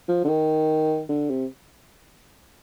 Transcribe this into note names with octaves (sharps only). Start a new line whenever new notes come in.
F3
D3
D#3
D3
C3